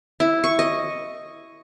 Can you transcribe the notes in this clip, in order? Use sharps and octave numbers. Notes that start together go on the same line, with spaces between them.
E4
C#6
D#5